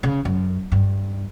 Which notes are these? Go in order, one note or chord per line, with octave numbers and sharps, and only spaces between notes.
C#3
F#2
G2